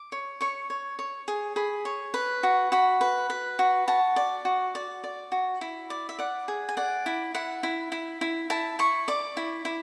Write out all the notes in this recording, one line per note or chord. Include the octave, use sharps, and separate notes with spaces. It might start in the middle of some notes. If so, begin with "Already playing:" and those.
Already playing: D6
C#5
C#5 C#6
C#5
C#5
G#4
G#4 B5
C#5
B4
F#4
F#4 B5
B4
B4
F#4
F#4 A5
D5
F#4
D5
D5
F#4
E4
D5
E5
D5 F#5
G#4
G#5
D5 F#5
E4
E4 F#5
E4
E4
E4
E4 A5
E4 C#6
D5 D6
E4
E4